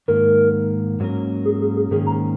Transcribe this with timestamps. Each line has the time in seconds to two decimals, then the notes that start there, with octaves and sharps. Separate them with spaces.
0.08 G#2 D#3 A#3 A#4
1.00 G#2 F#3 A#3 C#4 A#4
1.45 G#4
1.61 G#4
1.77 G#4
1.91 G#2 D#3 A#3 C#4 G#4
2.07 A#5